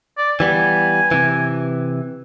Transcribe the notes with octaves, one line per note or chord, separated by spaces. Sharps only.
D5
E3 G3 B3 G#5
C3 E3